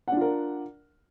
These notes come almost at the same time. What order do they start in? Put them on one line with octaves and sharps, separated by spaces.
F#5 D4 F4 A#4